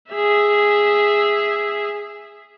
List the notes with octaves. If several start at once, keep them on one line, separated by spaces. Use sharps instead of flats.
G#4 E5